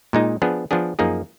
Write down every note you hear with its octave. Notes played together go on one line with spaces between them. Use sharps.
A#2 G#3 D#4
F3 B3 D4 G#4
F3 B3 D4 G#4
F#2 F3 A#3 D#4 G#4